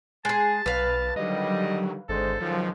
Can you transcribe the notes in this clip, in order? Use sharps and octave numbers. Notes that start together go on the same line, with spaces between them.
G#3 G#4 A5
B1 B4 F5
D3 D#3 F#3 G3 D#5
G#1 D3 G#3 A4 C5
C#2 D#3 F3 F#3